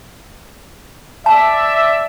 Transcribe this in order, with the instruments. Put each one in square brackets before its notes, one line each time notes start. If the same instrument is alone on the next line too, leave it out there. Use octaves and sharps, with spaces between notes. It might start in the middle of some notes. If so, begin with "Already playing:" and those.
[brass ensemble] D5 E5 [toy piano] A5